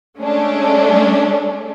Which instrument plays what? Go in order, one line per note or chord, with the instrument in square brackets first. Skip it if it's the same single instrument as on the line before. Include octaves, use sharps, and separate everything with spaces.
[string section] G#3 A3 C#4 D4